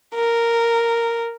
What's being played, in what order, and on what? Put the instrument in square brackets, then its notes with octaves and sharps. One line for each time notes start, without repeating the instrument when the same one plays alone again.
[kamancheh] A#4